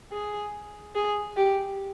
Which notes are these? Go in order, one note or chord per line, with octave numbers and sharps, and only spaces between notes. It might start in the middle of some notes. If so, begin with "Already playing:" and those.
G#4
G#4
G4